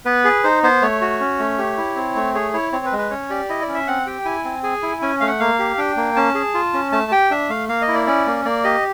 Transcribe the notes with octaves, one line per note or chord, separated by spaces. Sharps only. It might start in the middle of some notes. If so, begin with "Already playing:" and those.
B3 B4
G#4
D#4 C5
B3 C5
A3 C#5
F#4
C#4
A3
G4
E4
C4
A3
G#4 C#5
E4 C#5
C4 C#5
B4
G#3
B4
C#4 C#5
G4 D5
E4 D#5
D5
C#4
E5
C4 F#5
G4 G5
E4 G#5
C4
G#4 G#5
E4
C#4 G#5
A3 F5
F#5
A#3 F5
G4
D4 G5
A#3
C#4 A5
G#4
F4
C#4
A3 A5
G4 G5
D4 E5
A3 F5
A#3 F5
D#5
E4
D5
C#4 D5
A#3
A#3 D5
G4 D#5